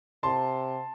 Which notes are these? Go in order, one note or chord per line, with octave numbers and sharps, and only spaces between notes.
C3 A5 C6